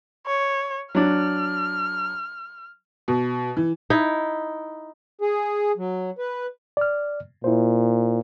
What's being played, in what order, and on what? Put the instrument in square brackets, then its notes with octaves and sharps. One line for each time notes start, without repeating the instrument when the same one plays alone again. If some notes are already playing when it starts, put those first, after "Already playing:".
[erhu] C#5
[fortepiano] F#3 D4 [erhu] F6
[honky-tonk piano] B2
E3
[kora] D#4 E4
[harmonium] G#4
F#3
B4
[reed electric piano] D5 F6
[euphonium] A#2 [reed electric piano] E4 C5